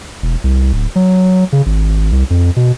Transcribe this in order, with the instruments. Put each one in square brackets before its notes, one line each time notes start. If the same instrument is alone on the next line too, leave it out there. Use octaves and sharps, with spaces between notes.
[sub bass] E1
C2
D1
F#3
C#3
G#1
C2
F2
B2